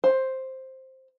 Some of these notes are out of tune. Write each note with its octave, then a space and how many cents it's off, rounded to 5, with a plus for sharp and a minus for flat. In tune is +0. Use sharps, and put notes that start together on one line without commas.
C5 +5